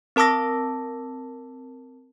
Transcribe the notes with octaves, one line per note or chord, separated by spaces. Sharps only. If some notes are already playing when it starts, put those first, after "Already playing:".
C4 A#4 A5 D6 E6 A#6